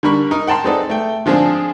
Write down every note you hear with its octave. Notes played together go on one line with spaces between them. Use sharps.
D3 G3 A#4 B5 C#6
D#4 A#4
F#5 G5 A5 A#5 C6
G#3 C4 D#4 A4 B4 D5
A3 G5
D3 F3 G#3 C4 D4 G#4